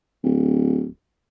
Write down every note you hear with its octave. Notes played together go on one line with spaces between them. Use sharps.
D1